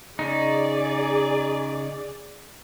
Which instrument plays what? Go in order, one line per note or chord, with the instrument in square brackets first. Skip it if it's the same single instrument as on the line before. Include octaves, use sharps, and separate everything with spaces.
[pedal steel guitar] C#3 D#4 [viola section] G#4 D5